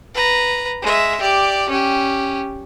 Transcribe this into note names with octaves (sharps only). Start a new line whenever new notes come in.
B4 A#5
G#3 E5
G4 D5
C#4 G4